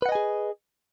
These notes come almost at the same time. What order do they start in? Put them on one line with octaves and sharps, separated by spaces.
B4 F#5 D#5 G#5 G#4